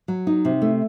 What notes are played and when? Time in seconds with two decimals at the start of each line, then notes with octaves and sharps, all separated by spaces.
0.08 F#3
0.27 D#4
0.45 C3
0.62 A3